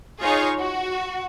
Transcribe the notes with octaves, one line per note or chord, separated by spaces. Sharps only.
D#4 F4 G#4 C#5 F5
F#4